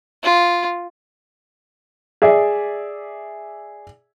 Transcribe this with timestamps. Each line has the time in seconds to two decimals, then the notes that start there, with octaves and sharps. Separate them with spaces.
0.24 F4
2.22 G#4 D5 E5